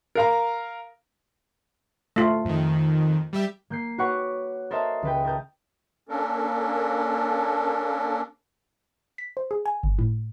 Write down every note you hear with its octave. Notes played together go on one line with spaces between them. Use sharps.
A#4 F5 A#5
A3 F4
F2 D#3
G3 G4 E5
A#3 G6 C7
F#4 B4 C#5 F#5 C#6 D6
A4 A#4 C5 D#5 E5 A5
C#2 B4 G5
A#4 A5 D#6 G6
A#3 C#4 D4 A4 A#4
B6
C5
G#4
G#5
G1
A2